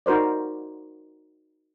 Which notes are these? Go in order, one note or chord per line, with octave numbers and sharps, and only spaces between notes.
D#4 F#4 A#4 C5 D5